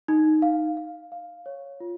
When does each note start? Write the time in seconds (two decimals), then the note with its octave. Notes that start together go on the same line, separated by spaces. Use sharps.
0.08 D#4
0.42 F5
0.77 F5
1.12 F5
1.46 C#5
1.80 F4